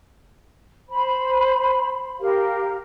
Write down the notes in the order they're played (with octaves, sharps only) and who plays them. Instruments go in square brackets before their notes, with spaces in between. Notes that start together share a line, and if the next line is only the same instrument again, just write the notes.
[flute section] C5 B5
G4 A#4 F5